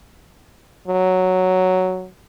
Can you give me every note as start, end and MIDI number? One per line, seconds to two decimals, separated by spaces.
0.88 2.08 54